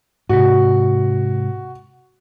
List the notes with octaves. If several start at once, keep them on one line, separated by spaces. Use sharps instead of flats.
G#2 C3 F#4